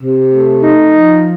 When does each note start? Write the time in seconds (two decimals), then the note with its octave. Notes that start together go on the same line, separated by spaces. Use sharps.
0.03 C3
0.33 A3
0.63 D#4
0.93 F3